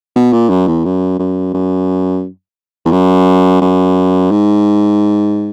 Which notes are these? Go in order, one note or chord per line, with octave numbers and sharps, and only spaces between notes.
B2
A#2
F#2
E2
F#2
F#2
F#2
E2
F#2
F#2
G#2